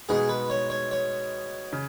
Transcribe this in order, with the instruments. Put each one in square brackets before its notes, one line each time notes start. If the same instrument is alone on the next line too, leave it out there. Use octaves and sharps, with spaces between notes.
[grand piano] B2 G#3 B3 D#4 [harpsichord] G#4
[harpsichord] B4
C#5
C#5
C#5
[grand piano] C#3